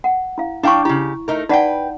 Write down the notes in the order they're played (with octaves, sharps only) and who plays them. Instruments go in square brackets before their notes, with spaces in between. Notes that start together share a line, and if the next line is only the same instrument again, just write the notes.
[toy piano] F#5
E4 F5
[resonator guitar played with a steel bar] D4 F5 G5 [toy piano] E4 C#6
[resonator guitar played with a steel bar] C#3 G4 [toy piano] E4
[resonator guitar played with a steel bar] A3 D#4 A#4
[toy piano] D#4 D5 F#5 [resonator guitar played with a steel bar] B4 C#5 G5